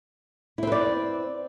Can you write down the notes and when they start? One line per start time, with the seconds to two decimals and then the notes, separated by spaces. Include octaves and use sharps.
0.58 E4
0.63 C4
0.67 B4
0.72 D5